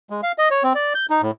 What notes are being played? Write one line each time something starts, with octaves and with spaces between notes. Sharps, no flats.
G#3
F5
D#5
C#5
C4
D5
G6
D#4
A2